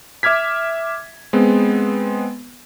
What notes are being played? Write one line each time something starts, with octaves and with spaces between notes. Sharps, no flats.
E5 D6 F6 G#6 B6
G#3 B3 C4